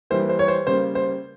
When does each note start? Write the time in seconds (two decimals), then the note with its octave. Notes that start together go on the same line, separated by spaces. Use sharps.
0.10 E3 G3 A#3 C5
0.29 C5
0.39 C#5
0.48 C5
0.67 C#3 G3 A#3 C5
0.95 C5